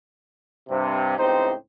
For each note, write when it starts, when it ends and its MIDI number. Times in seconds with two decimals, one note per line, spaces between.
0.70 1.16 43
0.70 1.16 48
1.18 1.53 37
1.18 1.53 45
1.18 1.53 60
1.18 1.53 63
1.18 1.53 67
1.18 1.53 72